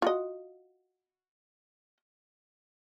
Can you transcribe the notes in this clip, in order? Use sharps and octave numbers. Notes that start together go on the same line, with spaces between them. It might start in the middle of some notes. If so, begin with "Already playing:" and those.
F4 F#4 D#5